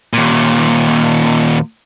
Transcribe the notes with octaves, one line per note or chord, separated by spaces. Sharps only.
D#2 A#2